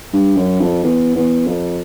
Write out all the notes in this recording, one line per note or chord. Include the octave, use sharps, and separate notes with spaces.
G2
F#2
F2
E2
E2
F2